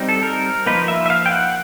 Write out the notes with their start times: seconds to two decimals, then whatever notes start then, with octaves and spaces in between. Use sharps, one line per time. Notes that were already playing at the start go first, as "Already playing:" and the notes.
Already playing: G3 C4 D#4
0.09 A4
0.23 A#4
0.66 F3 A#3 D#4 B4
0.88 E5
1.06 E5
1.10 F5
1.26 G5
1.32 F#5